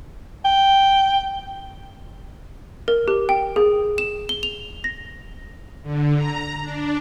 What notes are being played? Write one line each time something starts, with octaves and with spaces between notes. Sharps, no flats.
G5
A#4
G4
G5
G#4
E7
G7
F7
A#6
D3
A#5
D4